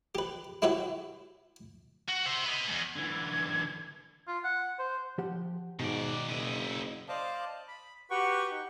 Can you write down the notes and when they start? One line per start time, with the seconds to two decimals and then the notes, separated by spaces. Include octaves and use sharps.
0.15 G4 B4
0.62 E4 F#4 G4 B4 C#5 E5
2.09 F#4
2.26 C5 E5
2.46 B4 D#5
2.67 E2 G#2
2.96 D3 E3 G#6
4.27 F4
4.44 F#5
4.79 C5
5.18 F3 G4 F#5
5.80 G#2 B2 D#3 D5
6.29 F#1 E4 D#5
7.08 C5 D5 D#5 F5 A5 D6
7.68 B5
8.11 F#4 G4 B4 F#5 G5 C#6
8.51 D#4